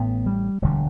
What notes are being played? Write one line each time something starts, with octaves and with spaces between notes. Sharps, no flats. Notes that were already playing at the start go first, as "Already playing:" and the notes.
Already playing: A1 A2 B3
G3
E1 D2 D3 G3